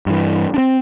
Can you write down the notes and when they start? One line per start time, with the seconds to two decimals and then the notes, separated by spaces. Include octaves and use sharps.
0.06 G2 E3
0.54 C4 D4